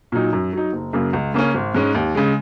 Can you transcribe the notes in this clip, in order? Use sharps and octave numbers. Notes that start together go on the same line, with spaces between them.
A#2 F#3 D#4
F#2
F#3 D#4
F#1
F#2 C#3 A#3
C#2
C#3 A#3 C#4
G#1
G#2 G#3 C#4
D#2
C#3 G#3